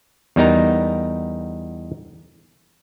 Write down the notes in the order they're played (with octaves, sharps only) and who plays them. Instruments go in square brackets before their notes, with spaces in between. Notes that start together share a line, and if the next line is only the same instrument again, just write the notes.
[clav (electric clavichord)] E2 G3 B3 D#4 A#4 A#5